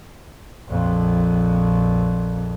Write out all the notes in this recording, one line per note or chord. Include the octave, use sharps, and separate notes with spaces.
A#1 F2